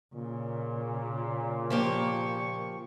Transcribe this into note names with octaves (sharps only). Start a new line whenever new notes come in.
A#2 C#3
F3 A#3 G4 C#6